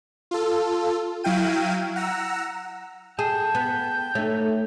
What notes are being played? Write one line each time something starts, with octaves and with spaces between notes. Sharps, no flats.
F4 A4
F#3 E4 F5 G5 D#7
F#5 A#5 E6
G#4 G5 A5
B3
A3 D#4 C#5